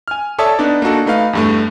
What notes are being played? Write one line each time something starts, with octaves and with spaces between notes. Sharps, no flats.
G#5 F6
A4 C#5 D5 E5 A5 D#6
B3 D4 D#4 D5
A#3 D4 D#4 F#4 A4
A3 D#4 B4 F5
E2 G2 A3